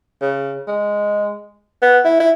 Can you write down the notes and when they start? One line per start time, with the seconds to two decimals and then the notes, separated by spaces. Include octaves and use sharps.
0.21 C#3
0.68 G#3
1.82 B3
2.05 E4
2.20 E4